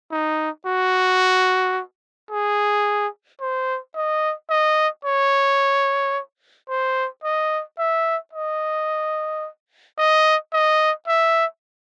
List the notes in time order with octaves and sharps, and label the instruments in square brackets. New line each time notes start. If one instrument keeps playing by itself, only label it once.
[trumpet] D#4
F#4
G#4
C5
D#5
D#5
C#5
C5
D#5
E5
D#5
D#5
D#5
E5